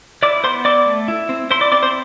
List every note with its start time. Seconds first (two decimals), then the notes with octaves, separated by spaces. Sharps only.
0.23 E4 D5 D6
0.44 B3 C5 C6
0.65 E4 D5 D6
0.86 A3
1.08 E4
1.29 C4
1.51 E4 C5 C6
1.61 D5 D6
1.72 C4 D5 D6
1.83 C5 C6